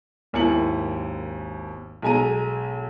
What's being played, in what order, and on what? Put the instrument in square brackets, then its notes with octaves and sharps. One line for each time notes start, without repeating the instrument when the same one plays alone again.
[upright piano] G#1 D#2 E4 G#5 C#7 F#7
B1 G#3 G#5 A#5 D#7